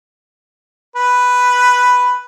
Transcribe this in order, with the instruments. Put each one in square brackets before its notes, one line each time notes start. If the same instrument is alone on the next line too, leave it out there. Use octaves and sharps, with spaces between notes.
[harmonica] B4